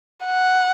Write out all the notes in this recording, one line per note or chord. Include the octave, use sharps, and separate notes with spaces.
F#5